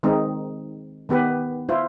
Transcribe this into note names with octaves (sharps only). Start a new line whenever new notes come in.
D#3 G#3 C4 D#4
D#3 B3 G4 B4
E4 F4 C5